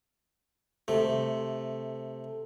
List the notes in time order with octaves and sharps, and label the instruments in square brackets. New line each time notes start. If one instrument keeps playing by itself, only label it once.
[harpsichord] C3 A3